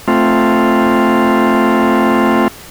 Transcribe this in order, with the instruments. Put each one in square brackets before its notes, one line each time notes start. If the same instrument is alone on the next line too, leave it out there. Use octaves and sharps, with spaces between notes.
[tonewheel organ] A3 C4 F4